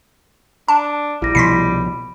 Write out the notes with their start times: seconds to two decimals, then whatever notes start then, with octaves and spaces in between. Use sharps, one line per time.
0.68 D4 A5
1.22 A#1 G3 E4 A#6
1.35 C2 B2 F3 B5 C6 B6 C7